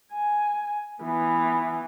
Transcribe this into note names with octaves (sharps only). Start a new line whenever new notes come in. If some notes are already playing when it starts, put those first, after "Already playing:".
G#5
E3 B3